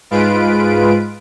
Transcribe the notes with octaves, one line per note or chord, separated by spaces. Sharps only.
G#2 G#3 F4 B4 D7